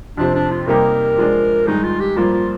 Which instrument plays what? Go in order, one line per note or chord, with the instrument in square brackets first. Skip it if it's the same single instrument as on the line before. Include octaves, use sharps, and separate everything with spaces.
[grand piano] F2 C3 F3 C4 [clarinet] D4
[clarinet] D4
F4
[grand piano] C3 G3 A#3 D#4 G4 [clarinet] A#4
[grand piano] F3 G#3 D4
[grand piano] G2 D#3 G#3 [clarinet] D#4
[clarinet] F4
G4
[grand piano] G2 F3 A#3 [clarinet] F4
[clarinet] F4